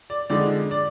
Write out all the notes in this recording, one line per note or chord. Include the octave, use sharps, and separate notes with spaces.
D5
F2 D3 G#3 D#4 D5
D5